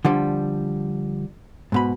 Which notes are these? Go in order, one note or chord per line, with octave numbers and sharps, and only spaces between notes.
D3 F3 G3
G#2 B2 B5